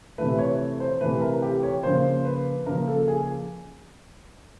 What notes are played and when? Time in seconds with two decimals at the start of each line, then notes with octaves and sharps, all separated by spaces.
0.18 C3 E3 A3 B4
0.39 C#5
0.80 C5
1.01 C3 E3 A3 B4
1.21 A#4
1.42 G4
1.63 C#5
1.83 C#3 F3 A#3 C5
2.25 B4
2.66 C#3 F3 A#3 A#4
2.88 A4
3.08 G#4